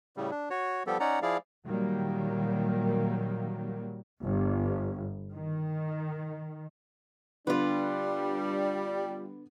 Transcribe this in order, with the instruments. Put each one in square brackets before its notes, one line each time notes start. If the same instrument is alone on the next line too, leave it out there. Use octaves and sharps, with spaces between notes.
[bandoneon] A2 C#3 G3
D4
F#4 C#5
F3 G3 B3 G4 A4
C#4 D#4 D5 F#5 A#5
F3 E4 G#4 D5 F5
[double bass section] A#2 D#3 F#3 G3 A#3
G1
D#3
[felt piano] D3 B3 [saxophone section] G3 [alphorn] D4 [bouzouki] F4 B4